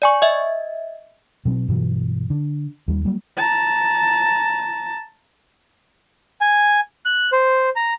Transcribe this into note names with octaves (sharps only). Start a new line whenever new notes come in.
D5 G#5 C#6
D#5 E5
B2 F#3 C4
G2 B2 E3 F#3
D3
D#2 G3
F#3 G3 A#3
A5 A#5
G#5
F#6
C5
A#5